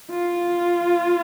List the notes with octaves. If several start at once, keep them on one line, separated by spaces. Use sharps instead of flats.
F4